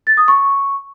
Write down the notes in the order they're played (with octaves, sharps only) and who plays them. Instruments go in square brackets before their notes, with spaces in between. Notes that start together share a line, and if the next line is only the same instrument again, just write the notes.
[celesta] A6
D#6
C#6